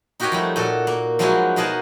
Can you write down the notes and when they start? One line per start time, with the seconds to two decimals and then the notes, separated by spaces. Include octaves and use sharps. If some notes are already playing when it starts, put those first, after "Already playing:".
0.20 D#4 F#4 G4 A#4 C#5 D#5
0.32 F3 G3 A3
0.56 A#2 F#4 A4
0.87 A#3
1.19 F3 F#3 G#3 D#4 E4 F#4
1.56 B2 D#4 G#4 A#4 F#5 A5